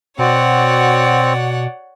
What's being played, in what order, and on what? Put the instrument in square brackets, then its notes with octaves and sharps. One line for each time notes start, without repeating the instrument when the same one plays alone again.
[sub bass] B2 [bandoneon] C4 [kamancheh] F#4 D5 [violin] C#5 F#5